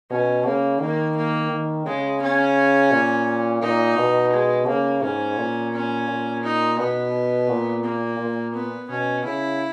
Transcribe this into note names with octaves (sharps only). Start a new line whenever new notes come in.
B2 C#4
C#3 A#3
D#3 A#3
A#3
D#3
C#3 G#3
C#4
A#2
A#2 D#4
B2
G#3
C#3 A#3
G#2 C#4
A#2
C#4
A#2
D#4
B2 B3
A#2
A#3
A#2
B3
B2 C#4
C#3 E4